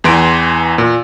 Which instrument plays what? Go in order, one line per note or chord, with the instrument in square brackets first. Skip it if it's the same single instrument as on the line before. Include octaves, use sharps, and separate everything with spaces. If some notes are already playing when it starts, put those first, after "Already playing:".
[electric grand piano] E2 E3 C6 D7
A#2